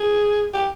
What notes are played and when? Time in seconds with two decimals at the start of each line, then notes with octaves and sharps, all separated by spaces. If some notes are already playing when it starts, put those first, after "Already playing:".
Already playing: G#4
0.54 G4